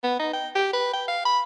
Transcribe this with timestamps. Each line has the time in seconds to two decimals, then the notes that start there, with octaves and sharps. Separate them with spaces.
0.03 B3
0.19 D#4
0.34 G5
0.55 G4
0.73 B4
0.93 G5
1.08 F5
1.25 B5